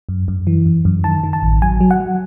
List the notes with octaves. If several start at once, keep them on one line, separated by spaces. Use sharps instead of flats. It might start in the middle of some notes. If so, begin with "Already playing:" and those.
F#2
F#2
E3
F#2
F#2
D#3 A5
D#3
A5
A1
F#3 G#5
F#3
F#5
F#3